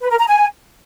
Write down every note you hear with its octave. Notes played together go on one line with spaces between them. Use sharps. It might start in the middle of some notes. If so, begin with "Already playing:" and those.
B4
A#4
A#5
G#5